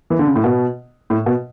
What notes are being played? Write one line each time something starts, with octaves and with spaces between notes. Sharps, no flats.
E3
D3
C#3
A2
B2
A2
B2